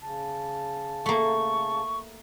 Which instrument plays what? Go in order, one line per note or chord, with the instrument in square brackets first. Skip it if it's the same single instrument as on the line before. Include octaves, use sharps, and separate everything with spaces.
[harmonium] C#3 A5
[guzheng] A3 A#3 [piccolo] C#6